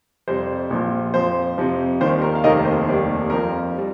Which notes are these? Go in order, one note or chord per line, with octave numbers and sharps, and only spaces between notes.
F2 C3 G3 C5
A#1 A#2 F3
F2 F3 C5
F2 C3 F3
D#2 D#3 G3 C5
A#4
F5
F1 D#2 D#3 A#4 D#5
C5
F1 D#2 D#3 G3
F2 F3 A#4
G3